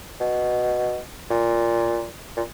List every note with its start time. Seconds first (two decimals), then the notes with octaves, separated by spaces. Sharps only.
0.20 B2
1.30 A#2
2.36 A#2